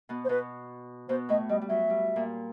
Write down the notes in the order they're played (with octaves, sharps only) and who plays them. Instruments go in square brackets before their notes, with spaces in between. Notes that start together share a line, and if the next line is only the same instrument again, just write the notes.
[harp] B2 B3
[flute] C5
[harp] B2 B3 [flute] B4
[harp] B2 B3 [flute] C5
[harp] A2 A3 [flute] D#5
[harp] G3 [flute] D#5
[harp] G3
[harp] F#3 [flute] E5
[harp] G3
A#2 A#3